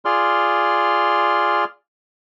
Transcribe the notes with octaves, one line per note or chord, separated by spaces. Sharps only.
F4 G#4 D5 C6 F6